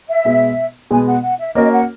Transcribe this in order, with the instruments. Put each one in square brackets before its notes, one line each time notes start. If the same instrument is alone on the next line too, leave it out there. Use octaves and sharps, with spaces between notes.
[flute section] E5
[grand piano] B2 G#3 B3
[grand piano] B2 G#3 B3 [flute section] G#5
[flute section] F#5
F#5
E5
[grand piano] A#3 C#4 F#4 A#4 [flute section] D#5
[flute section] F#5